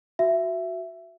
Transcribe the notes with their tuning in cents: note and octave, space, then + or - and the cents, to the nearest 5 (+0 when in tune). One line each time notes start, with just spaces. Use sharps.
F#4 +0 E5 +15